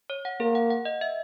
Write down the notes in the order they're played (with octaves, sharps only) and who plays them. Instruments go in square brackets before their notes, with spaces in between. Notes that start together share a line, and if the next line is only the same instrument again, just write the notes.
[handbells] C#5
F#5
[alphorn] A#3 [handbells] G#4
[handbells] F#5
F#5
D#5
E5